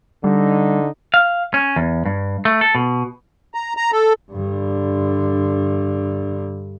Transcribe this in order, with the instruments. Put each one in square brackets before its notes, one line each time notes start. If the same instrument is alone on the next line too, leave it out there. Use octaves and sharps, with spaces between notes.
[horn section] D3 D#4 [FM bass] G3
[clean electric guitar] F5
C#4
E2
G2
A3
A4
B2
[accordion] A#5
A#5
A4
[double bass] G2 D3